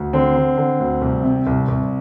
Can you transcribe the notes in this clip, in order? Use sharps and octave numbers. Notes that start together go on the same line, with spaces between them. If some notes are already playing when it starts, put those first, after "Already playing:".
Already playing: D2
D3 C4
D3
D3
D2
C2
C3
C2
C2